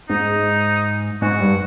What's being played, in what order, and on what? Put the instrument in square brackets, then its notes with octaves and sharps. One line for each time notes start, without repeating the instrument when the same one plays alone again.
[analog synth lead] G#2 [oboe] D#4
[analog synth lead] G#2 [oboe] F#4
[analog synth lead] G2